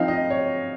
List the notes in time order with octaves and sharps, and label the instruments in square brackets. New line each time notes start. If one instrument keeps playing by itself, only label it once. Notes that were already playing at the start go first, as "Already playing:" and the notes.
Already playing: [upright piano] F3 C4 D#4 F5
D#5
C#5